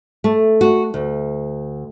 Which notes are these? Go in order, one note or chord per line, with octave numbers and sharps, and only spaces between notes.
A3
F#4
D2